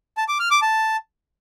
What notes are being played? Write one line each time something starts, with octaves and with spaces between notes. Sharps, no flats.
A5
D6
F6
D6
A5